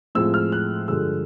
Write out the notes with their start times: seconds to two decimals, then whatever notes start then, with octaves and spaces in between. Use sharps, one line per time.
0.15 A2 F3 G#3 C4 E6
0.34 F6
0.52 F#6
0.88 G2 D3 F3 G#3 E6